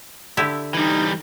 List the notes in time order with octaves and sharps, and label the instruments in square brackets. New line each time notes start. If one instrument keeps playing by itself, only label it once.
[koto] D3 E4 G4
[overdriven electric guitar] E3 G3 [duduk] D#4